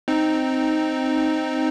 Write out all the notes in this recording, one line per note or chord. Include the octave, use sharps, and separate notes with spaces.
C4 D#4